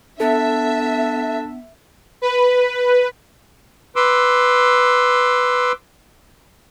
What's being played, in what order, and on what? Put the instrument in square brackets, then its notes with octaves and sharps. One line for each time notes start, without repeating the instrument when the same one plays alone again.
[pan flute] B3 [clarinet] D4 [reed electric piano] A4 [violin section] E5
[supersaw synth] B4
[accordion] B4 C6 D6 E6